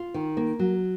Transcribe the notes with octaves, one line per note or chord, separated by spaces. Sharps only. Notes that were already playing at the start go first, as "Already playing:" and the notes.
Already playing: F4
D#3
A#3
F#3